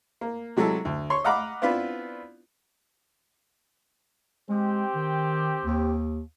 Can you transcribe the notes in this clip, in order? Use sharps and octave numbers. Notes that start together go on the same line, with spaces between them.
A#3
C3 F#3 G#3 E4 A4
D2
C#5 C6 C#6
D#5 F5 F#5 A#5 B5 D6
B3 C4 D4 E4 F4 B4
G#3 C4 G4
D#3
D#2